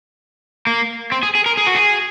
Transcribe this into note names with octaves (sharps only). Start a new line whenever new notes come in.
A#3
C4
G#4
G#4
A#4
G#4
F#4
G#4